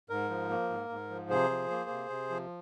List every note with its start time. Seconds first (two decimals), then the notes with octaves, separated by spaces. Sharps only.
0.10 G#2 A#4
0.30 F3
0.50 A#3
0.70 G#2
0.90 G#2
1.10 F3
1.30 C3 G#4 C5
1.50 F3
1.71 A#3
1.90 C3
2.10 C3
2.30 F3